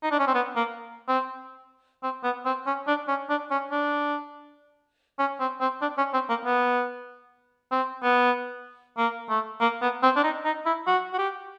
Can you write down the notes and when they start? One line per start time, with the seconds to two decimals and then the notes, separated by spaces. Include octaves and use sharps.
0.03 D#4
0.11 D4
0.19 C#4
0.27 C4
0.34 B3
0.56 A#3
1.08 C4
2.03 C4
2.24 B3
2.45 C4
2.66 C#4
2.87 D4
3.08 C#4
3.29 D4
3.51 C#4
3.71 D4
5.19 C#4
5.40 C4
5.61 C4
5.82 D4
5.98 C#4
6.13 C4
6.29 A#3
6.45 B3
7.72 C4
8.03 B3
8.98 A#3
9.29 A3
9.61 A#3
9.82 B3
10.03 C4
10.16 D4
10.24 D#4
10.45 D#4
10.66 E4
10.87 F#4
11.13 F#4
11.18 G4